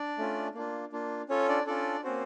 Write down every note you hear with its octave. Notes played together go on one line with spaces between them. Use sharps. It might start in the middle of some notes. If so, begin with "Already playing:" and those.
Already playing: D4 D5
A3 C#4 F4
A#3 D4 F4
A#3 D4 F4
C#4 F4 A4 C#5
D4 D5
C#4 D4 F4 A4 D5
A#3 C4 C#4 F#4 C5